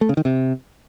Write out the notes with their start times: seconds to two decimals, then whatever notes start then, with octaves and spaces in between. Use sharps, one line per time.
0.01 A3
0.09 C#3
0.17 D#3
0.25 C3